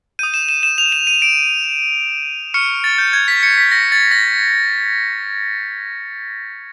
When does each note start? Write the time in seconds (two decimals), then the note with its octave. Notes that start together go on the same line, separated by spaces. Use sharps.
0.19 D#6 G6 D#7
0.34 E7
0.49 E7
0.63 E7
0.78 F7
0.92 E7
1.07 D#7
1.22 D7
2.54 C#6 F6 C#7
2.84 A6
2.98 G6
3.13 G#6
3.28 B6
3.43 C#7
3.58 B6
3.71 A#6
3.92 A6
4.11 A#6